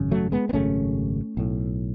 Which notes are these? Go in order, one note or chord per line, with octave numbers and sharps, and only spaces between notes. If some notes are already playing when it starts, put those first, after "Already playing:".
Already playing: G#1 F#2 C#3
F#3 A3
G#3 B3
B3
G#1 F#2 C#3 A3 C#4
B1 A2